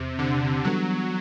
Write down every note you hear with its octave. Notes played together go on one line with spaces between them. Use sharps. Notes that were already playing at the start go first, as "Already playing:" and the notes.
Already playing: E2 C3
D3
E3 F#3 G3 B3 D4 A4